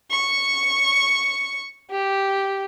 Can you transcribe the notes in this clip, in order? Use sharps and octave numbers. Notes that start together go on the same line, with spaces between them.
C#6
G4